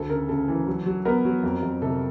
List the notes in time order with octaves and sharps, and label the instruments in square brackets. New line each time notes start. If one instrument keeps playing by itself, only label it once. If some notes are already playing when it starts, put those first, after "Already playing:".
Already playing: [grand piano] D2 A4
C#3 A#4
C#3 A4
E3
F#3
F#3
B3 A#4
F#3
F2
F2
C3 A4